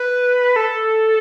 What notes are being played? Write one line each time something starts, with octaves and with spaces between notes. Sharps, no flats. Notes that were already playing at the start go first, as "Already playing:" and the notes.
Already playing: B4
A4